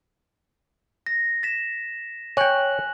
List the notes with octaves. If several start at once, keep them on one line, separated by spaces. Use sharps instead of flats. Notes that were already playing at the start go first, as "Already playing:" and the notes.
A#6
A6 B6 E7
C#5 G5 G#5 F#6 F#7